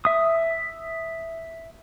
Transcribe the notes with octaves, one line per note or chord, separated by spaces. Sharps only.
E5 D#6